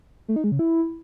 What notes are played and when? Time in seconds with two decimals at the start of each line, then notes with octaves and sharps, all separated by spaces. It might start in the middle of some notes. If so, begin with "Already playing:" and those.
0.28 A3
0.36 D#4
0.44 G#3
0.52 C#3
0.59 E4